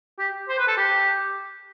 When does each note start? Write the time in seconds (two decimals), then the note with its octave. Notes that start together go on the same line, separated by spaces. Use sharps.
0.19 G4
0.49 C5
0.59 B4
0.68 A4
0.77 G4